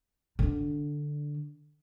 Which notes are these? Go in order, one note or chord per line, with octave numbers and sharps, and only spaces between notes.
D3 D4